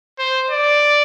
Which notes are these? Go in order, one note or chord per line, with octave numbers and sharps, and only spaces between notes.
C5
D5